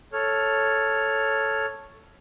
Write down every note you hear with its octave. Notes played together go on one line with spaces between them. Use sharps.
A4 C#5 F6